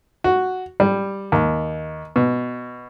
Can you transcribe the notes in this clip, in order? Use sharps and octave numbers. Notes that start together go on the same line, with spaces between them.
F#4
G3
D#2
B2